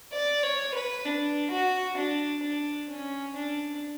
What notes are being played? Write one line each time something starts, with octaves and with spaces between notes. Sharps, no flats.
D5
C#5
B4
D4
F#4
D4
D4
C#4
D4